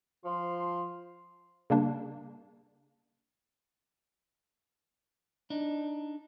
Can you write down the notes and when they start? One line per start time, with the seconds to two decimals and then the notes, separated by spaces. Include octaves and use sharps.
0.23 F3 C6
1.70 C#3 G3 A#3 D4
5.50 D4 D#4